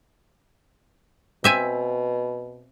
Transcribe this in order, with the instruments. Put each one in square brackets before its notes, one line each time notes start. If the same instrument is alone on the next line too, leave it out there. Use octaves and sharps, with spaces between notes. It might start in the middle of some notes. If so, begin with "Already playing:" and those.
[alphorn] B2 [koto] C4 E5 G#5